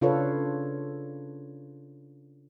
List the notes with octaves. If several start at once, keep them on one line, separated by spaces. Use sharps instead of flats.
C#3 D4 F4 A4 B4 C#5